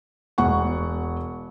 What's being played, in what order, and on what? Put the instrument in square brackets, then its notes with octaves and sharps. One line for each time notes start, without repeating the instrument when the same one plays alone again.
[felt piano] E1 F#5 C#6